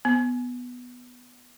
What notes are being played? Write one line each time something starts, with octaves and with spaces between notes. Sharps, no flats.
B3